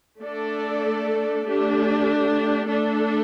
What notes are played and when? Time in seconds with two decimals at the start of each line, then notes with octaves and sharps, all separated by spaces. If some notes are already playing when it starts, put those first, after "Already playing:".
0.22 A3 D4 A4 D5
1.44 A3 D4 G4
2.67 A3 D4 A4